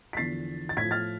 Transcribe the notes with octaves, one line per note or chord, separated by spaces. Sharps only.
B6
E2 D3 F3 A6 C7
A6
A2 F3 G#6 B6
F6 A6